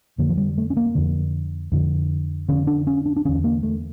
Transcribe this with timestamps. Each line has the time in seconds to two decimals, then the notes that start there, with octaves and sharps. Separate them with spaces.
0.18 F2 D3 A#3
0.29 F3
0.37 G3
0.58 A3
0.70 C#4
0.77 A#3
0.95 F2 D3
1.72 F2 D3
2.49 F2 D3 C#4
2.67 D4
2.87 C#4
3.06 D4
3.16 D4
3.25 E2 D3 C#4
3.44 A#3
3.63 A3